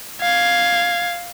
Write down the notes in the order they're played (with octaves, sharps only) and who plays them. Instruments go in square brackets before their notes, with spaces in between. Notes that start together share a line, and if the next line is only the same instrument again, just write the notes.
[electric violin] F5 G#6